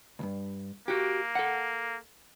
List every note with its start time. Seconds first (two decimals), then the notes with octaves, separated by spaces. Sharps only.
0.19 C#2 G2
0.88 A#3 F#4 G4
1.35 A4 F#5